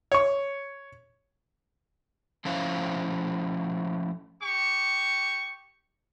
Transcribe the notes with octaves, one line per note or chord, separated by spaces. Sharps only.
C#5 C#6
F3 A3 C#4 E4 C5 F5
G4 C#6